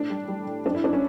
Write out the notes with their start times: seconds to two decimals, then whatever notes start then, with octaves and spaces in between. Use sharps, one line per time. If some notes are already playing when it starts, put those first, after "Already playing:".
Already playing: A2 A3 D4
0.10 G3
0.28 G3
0.46 A2
0.66 F#2 D4
0.75 E4
0.83 F#2 D4
0.93 C#4